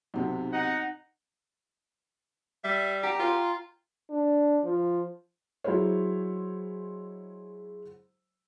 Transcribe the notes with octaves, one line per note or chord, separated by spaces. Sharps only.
B1 G#2 C3
D#4 F#5
G3 E5
G4 F#5 G5 A#5
F4 G5 C6 D6
D4
F3
F#3 G#3 E4 C5 C#5